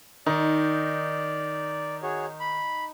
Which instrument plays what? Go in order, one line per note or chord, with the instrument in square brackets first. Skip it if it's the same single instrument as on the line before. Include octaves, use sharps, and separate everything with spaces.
[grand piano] D#3 [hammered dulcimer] D#4 [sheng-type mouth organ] D5
[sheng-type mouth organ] F#4 G#4 C#5
B5